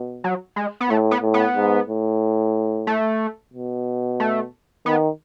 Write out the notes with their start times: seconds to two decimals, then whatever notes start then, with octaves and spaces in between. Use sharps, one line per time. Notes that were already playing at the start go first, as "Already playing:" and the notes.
Already playing: B2
0.24 F#3
0.56 G#3
0.80 B3
0.90 A2 A3
1.11 B3
1.22 A2
1.34 B3
1.56 G#2
1.89 A2
2.87 A3
3.53 B2
4.20 A3
4.86 D#3 B3